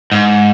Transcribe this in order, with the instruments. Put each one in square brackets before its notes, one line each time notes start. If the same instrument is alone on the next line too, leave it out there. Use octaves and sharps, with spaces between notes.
[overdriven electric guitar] G#2